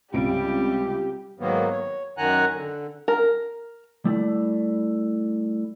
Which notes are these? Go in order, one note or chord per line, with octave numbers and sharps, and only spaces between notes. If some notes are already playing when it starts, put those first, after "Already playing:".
C#2 C3 G3 G4 D7
G#2 D#3 F#3 A#3 B3
C#5
F#2 D#3 F#5 G#5 A#5 F#6
D3
A#4
G3 A3 E4 D5